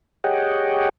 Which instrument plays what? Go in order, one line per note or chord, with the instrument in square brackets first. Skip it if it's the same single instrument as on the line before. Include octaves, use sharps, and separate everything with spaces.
[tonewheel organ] G4 G#4 C#5 D#5 F#5 G5